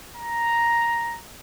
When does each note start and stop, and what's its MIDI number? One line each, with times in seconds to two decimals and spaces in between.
0.16 1.19 82